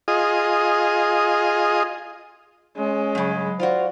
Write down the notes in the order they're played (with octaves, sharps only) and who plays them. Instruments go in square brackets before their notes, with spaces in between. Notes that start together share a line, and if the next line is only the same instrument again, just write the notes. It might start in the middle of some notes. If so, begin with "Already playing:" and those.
[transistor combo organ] F4 G#4 D#5
[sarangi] G#3 [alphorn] C#4
[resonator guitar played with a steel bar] G2 C#3 [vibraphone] F#3 B5
[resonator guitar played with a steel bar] F4 F#4 [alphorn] C5 [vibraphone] D5 F5